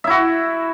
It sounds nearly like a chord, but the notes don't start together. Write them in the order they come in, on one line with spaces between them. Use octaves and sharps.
E5 E4 F#4